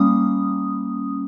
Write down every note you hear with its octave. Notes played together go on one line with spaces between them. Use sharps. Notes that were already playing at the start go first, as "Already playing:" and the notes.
Already playing: G3 A#3 C#4 D#6